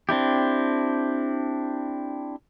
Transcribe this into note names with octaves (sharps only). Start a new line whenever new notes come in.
C4 D4 E4 G4